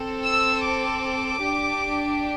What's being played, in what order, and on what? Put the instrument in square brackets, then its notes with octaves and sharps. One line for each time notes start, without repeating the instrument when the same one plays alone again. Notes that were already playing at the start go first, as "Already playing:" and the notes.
Already playing: [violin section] C4 A4
E6
D6
D4 G4